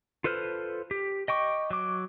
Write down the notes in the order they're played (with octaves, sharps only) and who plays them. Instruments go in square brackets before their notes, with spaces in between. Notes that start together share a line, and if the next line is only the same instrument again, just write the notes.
[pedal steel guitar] F4 A4 B4 C5 F6
G4
D#5 G5 C#6 D6
F#3 D6